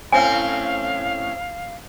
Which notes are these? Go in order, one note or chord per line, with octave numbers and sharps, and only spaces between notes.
A2 C4 C#4 F5 G#5